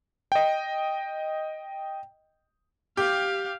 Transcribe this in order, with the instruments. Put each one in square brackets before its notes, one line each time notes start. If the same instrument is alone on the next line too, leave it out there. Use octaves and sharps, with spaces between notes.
[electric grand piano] D#5 G5
[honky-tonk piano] G4 [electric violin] F5